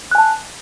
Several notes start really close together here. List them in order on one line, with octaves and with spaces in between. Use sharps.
F#6 G#5 A5